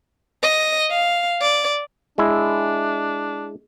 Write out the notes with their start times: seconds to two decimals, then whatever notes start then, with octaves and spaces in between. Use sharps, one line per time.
0.43 D#5
0.91 F5
1.41 D5
2.18 G#3 D4 E4